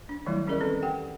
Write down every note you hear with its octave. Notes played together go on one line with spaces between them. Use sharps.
D4
D#3 E3 F#3 G3 A3 E4
G3 C#4 G#4 A#4 D5 D#5
C4 A4 B4
G4 F#5 G5